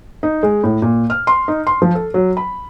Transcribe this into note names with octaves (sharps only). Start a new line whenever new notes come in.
D#4
G#3
A2
A#2
F6
C6
D#4
C6
F3
A4
F#3
B5